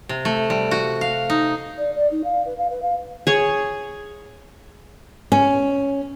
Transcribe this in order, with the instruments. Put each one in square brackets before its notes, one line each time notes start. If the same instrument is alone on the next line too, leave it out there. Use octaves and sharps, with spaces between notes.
[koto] C3
A3
G3
F#4
F5
D#4
[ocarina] D5
D5
D#4
F5
B4
F5
B4
F5
[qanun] G#4 C#5
[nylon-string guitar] C#4